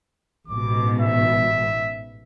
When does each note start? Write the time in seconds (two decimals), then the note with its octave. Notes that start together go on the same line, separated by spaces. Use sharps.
0.48 A1 G#2 B2 D6
1.00 E5